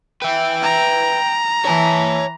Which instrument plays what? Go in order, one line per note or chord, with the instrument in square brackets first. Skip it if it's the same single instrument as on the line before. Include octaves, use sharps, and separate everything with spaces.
[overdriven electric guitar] B4 E5 [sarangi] G5
[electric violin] A#5
[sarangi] E3 [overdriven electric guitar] C#5 A5